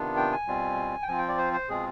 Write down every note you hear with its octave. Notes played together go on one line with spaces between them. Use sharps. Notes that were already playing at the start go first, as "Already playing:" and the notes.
Already playing: C3 D#3 B3 D4 F4
G5
G#5
B2 G3 C4 F4
G5
F3 C4 F4 G#5
G5
D5
C5
C5
B2 G#3 C4 F4 G#4